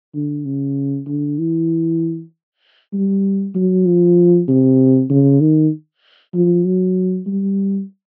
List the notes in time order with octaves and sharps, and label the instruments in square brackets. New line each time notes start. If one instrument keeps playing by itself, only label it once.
[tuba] D3
C#3
D3
E3
G3
F#3
F3
C3
C#3
D#3
F3
F#3
G3